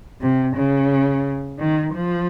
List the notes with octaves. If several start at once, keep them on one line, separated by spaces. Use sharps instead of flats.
C3
C#3
D#3
F3